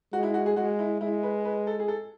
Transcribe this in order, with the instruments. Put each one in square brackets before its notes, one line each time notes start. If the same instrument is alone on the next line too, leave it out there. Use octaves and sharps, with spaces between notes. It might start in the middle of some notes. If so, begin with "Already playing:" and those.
[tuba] G#3 [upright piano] F#4
[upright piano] E4
F#4
G#4
[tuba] G#3 [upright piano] F#4
[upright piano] E4
[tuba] G#3 [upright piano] E4
[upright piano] B4
B4
A4
G#4
A4